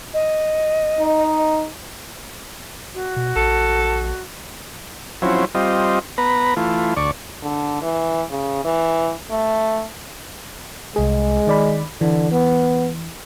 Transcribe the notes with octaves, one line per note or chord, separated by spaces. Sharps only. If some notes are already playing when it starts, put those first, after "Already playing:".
D#5
D#4
F#4
B2
A#1 A4
F3 F#3 C4 C#4 E4
G3 C4 F4 D#5
B3 B4 A#5
E3 A3 F4
D2 D5 C#6
D3
E3
C#3
E3
A3
C2 G#3 G#4
D#3 D5 B5
D3 E3
B3